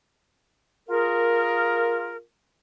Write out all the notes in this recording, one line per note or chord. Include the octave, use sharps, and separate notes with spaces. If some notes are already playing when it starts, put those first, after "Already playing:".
F4 G#4 A#4